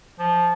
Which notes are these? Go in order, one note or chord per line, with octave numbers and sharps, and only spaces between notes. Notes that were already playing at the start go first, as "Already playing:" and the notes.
F3